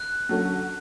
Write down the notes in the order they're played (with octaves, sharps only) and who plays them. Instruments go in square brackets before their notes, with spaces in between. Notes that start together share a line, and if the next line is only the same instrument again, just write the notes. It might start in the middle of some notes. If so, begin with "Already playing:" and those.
Already playing: [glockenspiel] F#6
[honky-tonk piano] D3 F#3 C#4 F#4 A4